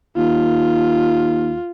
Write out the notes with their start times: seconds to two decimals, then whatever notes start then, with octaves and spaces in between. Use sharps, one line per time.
0.17 D#2 F4